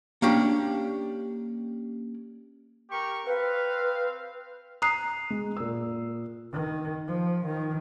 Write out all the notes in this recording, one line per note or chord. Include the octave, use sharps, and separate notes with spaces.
A#3 C#4 D4 G4
G4 A#4 C#6
C4 B4 F5
A#5 D#6 F#6 C7
G#3
A#2 E6
D#3
F3
D#3